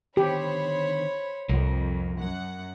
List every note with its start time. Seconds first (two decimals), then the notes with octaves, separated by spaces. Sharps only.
0.17 D3 D#3 B3 G4 C5 C#5 B5
1.49 C2 F2 F3 A#4
2.17 F#2 F#5